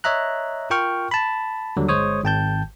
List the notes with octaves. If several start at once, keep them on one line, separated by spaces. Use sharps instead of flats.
C#5 D#5 E5 A#5 F#6
F4 A#4 G5 C#6 F6
A5 B5
D#2 D3 F#3 G3
G1 G#3 C5 C#5 D#6
G#1 G5 A5 G6